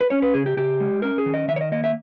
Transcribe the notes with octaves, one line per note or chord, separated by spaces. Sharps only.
B4
C#4 C#5
B4
C#3 G#4
G4
C#3 G4
G#3
C#4 A#4
G#4
D#3
D#5
D#3 E5
C#5
D#5
A#3 D#5
E5